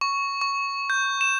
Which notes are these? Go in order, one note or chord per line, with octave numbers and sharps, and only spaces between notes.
C#6
C#6
G6
E7